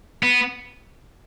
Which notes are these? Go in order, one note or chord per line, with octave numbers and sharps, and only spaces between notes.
B3